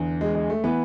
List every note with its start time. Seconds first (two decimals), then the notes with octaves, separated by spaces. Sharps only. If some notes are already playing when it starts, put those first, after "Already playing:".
Already playing: E2 D3
0.21 G#3
0.35 G#3
0.50 A3
0.64 E3 B3